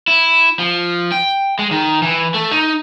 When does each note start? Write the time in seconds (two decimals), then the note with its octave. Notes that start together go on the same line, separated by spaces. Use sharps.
0.08 E4
0.59 F3
1.12 G5
1.59 G#3
1.71 D#3
2.02 E3
2.34 A3
2.51 D#4